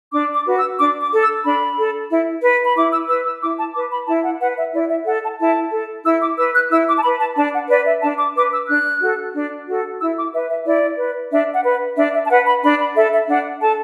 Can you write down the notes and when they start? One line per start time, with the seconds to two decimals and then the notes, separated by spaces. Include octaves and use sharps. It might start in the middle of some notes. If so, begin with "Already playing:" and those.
0.13 D4 D6
0.34 D6
0.46 F#4 B4
0.57 E6
0.79 D4 D6
1.01 D6
1.12 A4
1.22 E6
1.45 D4 B5
1.78 A4
2.10 E4
2.43 B4
2.64 B5
2.76 E4 D6
2.92 E6
3.09 B4 E6
3.26 E6
3.42 E4 D6
3.58 A5
3.75 B4 D6
3.91 B5
4.08 E4 A5
4.24 F#5
4.41 B4 F#5
4.57 E5
4.73 E4 D5
4.90 E5
5.06 A4 F#5
5.23 A5
5.39 E4 A5
5.72 A4
6.05 E4 E6
6.21 D6
6.38 B4 E6
6.55 F#6
6.71 E4 E6
6.88 D6
6.97 A5
7.03 B4 B5
7.20 A5
7.36 D4 A5
7.53 F#5
7.69 B4 D5
7.86 E5
8.02 D4 A5
8.19 D6
8.35 B4 D6
8.52 E6
8.68 D4 F#6
9.01 F#4 A4
9.35 D4
9.68 F#4 A4
9.99 E4 E6
10.17 D6
10.33 B4 E5
10.49 E5
10.66 E4 D5
10.99 B4
11.31 D4 E5
11.54 F#5
11.65 B4
11.97 D4 E5
12.14 E5
12.25 A5
12.30 B4 F#5
12.46 B5
12.63 D4 B5
12.80 B5
12.96 A4 E5
13.13 E5
13.29 D4 F#5
13.62 A4 A5